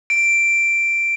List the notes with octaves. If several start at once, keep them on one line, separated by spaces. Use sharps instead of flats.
D7